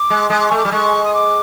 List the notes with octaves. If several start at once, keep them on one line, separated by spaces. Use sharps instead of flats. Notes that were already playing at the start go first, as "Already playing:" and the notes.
Already playing: D6
G#3
G#3 D#6
D6
A3 C#6
D6
G3
G#3 C#6
D#6
D6